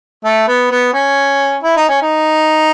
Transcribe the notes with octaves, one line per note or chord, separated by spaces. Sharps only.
A3
B3
B3
C#4
E4
D#4
C#4
D#4